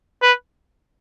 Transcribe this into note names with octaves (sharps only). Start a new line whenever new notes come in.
B4